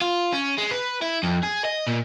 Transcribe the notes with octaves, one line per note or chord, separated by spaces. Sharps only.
F4
C#4
G#3
B4
E4
F2
G#4
D#5
A#2